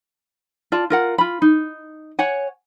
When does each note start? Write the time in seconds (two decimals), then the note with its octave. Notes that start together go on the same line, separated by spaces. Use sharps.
0.72 F4 D5 A5
0.90 F4 A#4 F#5
1.18 F4 B5
1.42 D#4
2.19 C#5 F#5 G#5